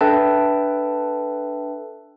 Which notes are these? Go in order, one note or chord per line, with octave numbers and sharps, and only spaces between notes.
D4 A4 B4 E5 G5 A5